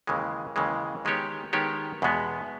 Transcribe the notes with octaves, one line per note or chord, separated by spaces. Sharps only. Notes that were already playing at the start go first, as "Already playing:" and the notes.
D#2 C#3 E3 G#3
D#2 C#3 E3 G#3
D#3 G#3 B3 G4 C#5
D#3 G#3 B3 G4 C#5
E2 B2 G#3 B3